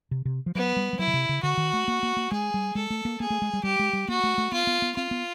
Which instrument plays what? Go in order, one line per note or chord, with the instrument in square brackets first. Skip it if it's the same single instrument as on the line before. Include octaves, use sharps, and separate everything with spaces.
[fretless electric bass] C3
C3
F3
[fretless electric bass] F#3 [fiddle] B3
[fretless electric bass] G3
G3
[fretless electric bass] F#3 [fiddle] E4
[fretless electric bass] C#3
C3
C#3
[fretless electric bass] D3 [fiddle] F#4
[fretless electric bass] D#3
A3
A#3
A#3
A#3
[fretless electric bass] G#3 [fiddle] G#4
[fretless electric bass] G3
[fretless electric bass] G#3 [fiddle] A4
[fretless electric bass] A3
A#3
[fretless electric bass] A#3 [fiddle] G#4
[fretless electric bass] A3
G#3
G3
[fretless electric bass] G3 [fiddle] G4
[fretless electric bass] G#3
G3
[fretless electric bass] A#3 [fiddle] F#4
[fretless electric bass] A3
A3
[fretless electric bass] B3 [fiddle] F4
[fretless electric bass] B3
B3
[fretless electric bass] C4 [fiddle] F4
[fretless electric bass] B3